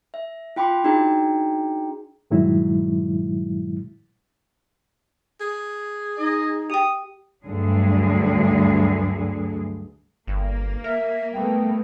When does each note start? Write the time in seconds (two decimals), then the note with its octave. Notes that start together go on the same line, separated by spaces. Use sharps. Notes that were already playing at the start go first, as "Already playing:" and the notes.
0.14 E5
0.56 F4 G5 B5 C6 D6
0.84 D4 D#4 F#4 G#4 G5 A#5
2.31 G2 A#2 D#3 F#3 G#3 E4
5.40 G#4
6.18 D#4 D#5
6.70 G4 G5 D#6
7.44 D2 G2 D3 F#3 G#4
10.27 G1 A#3
10.84 A#4 E5
11.33 G3 A3 B3 G5